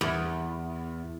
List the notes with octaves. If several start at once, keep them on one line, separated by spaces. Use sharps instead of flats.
E2